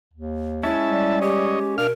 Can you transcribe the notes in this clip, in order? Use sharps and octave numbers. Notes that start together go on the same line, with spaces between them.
D#2
G#3 C#4 E4 E5 A5
G3
G4 C#5 D#5
B2 D4 A#4 F5 F6